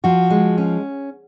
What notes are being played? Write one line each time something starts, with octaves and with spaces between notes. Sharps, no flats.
F3 F#4
G#3
C#4